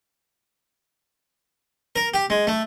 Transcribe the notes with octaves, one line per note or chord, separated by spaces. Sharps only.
A#4
G4
G#3
A3